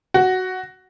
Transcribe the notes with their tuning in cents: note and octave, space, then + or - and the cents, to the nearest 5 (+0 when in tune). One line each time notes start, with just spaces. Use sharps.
F#4 +5